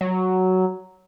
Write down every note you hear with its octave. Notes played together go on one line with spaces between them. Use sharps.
F#3